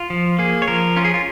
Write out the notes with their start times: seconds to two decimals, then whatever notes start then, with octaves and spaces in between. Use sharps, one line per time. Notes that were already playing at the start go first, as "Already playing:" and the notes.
Already playing: F4
0.10 F3
0.38 A#3 G#4
0.62 C#5
0.68 F3 A#4
0.96 C#4 F4
1.05 G#4
1.14 F4